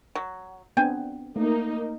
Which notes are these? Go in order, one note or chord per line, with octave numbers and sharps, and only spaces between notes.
F#3
B3 C4 D4 G5 G#5
A3 A#3 D#4